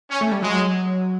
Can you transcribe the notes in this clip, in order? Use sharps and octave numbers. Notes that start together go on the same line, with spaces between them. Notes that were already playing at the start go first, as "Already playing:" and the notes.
C#4
A3
G3
F#3 G#3